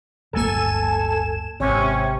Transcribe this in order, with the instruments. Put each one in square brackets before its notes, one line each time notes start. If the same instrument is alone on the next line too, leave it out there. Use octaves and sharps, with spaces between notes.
[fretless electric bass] D1 G1 A#3 [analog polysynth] A4 G#5 E7
[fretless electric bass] G#1 [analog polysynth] C3 [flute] C#4